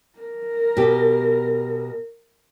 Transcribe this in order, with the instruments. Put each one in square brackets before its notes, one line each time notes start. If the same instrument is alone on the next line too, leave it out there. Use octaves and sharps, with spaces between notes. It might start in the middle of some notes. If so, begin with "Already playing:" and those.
[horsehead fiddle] A#4
[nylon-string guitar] B2 G4